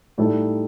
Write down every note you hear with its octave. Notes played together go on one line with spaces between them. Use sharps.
A2 G3 D#4 A4